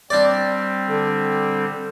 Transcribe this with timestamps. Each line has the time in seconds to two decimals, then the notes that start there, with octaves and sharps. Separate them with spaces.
0.10 G3 C4 D4 D5
0.89 D3